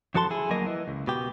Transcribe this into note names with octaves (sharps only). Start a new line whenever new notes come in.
F#2 F3 F#4 A4 A5 C6
E4 G#4
D2 F#3 A#3 A#4 D#5
E3
C#2
B2 G4